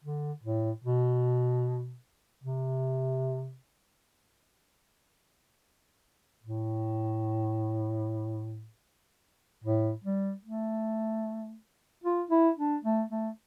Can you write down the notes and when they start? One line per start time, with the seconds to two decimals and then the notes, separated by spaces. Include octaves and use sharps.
0.04 D3
0.44 A2
0.84 B2
2.44 C3
6.44 A2
9.64 A2
10.04 G3
10.44 A3
12.04 F4
12.31 E4
12.58 D4
12.84 A3
13.11 A3